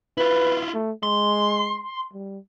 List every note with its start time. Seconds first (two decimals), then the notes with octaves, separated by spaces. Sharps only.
0.18 E4 F4 B4
0.74 A3
1.03 G#3 C6
2.13 G3